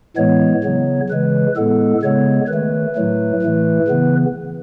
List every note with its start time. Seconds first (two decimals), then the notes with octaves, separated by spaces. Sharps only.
0.17 A2 E3 G#3 B3 C#5
0.64 C#3 F#3 B3
1.10 C#3 E3 G#3 B4
1.56 A2 G#3 B3 A4
2.03 C#3 G#3 B3 C#5
2.48 D#3 B4
2.54 A3
2.95 A2 F#3 A3
3.42 A2 E3 A3
3.88 C#3 E3 B3